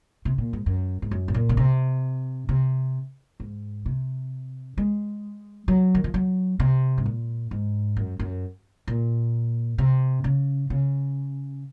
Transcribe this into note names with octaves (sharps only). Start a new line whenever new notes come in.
C3
A#2
G#2
F#2
G#2
F#2
G#2
A#2
C#3
C3
C3
G#2
C3
G#3
F#3
D#3
F3
F#3
C3
G#2
A#2
G#2
F#2
F#2
A#2
C3
C#3
C#3